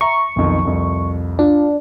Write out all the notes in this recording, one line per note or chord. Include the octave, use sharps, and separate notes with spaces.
E5 A#5 C#6
B1 F2 D#3
C2 F2
D4 F4